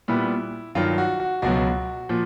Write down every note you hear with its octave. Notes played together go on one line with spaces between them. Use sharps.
A#2 G3 B3 E4
G2 D#3 F#3 F4
F#4
F#4
C#2 B2 F#3 F#4
A#2 F3